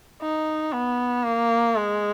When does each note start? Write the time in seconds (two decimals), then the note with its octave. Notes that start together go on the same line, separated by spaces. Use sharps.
0.22 D#4
0.73 B3
1.25 A#3
1.76 G#3